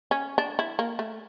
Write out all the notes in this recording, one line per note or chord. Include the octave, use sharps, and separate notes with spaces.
C#4
D4
E4
A#3
A3